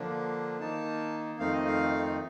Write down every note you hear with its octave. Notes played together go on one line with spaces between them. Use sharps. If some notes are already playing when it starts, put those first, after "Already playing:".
Already playing: D3 F3 A#3 D4
D#3 A#3 D#4 A5
F2 D#3 A3 C4 D#4 F5
D#5
F5